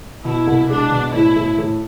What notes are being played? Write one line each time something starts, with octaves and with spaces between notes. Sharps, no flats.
B2 E4
C2
G#3 D4
B2
A2 E4
A2
A2